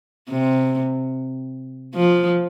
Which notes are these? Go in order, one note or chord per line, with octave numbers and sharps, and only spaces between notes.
C3
F3